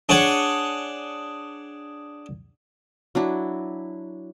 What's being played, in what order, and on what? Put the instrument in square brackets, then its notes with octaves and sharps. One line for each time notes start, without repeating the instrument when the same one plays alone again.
[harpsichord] D4 G#4 C#5 F#5 C#6
[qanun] F#3 D4 E4